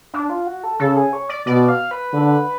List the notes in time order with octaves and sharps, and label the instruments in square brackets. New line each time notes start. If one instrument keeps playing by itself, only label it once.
[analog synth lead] D4
F4
F#4
A4
[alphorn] C#3 [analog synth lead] A4
[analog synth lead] G#4
C#5
D5
[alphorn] B2 [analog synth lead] D5
[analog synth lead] F5
B4
[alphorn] D3